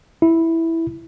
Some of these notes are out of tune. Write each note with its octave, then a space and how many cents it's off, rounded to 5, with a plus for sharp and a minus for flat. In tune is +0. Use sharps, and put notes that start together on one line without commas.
E4 -5